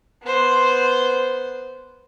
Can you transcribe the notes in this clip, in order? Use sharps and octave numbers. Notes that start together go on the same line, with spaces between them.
B3 C5